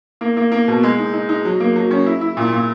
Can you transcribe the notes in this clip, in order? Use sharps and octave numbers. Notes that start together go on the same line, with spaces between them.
A#3
A#3
A#3
B2
G#3
D#4
D#4
D#4
F#3
A#3
F#3
C#4
E4
E4
A#2
A#2